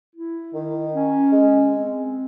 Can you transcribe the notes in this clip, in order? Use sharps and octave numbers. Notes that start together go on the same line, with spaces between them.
E4
D#3
C#4
G#3
C4